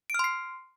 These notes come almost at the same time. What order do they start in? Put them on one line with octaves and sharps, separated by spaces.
D7 F6 C6 C7